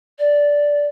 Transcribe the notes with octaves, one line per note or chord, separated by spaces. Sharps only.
D5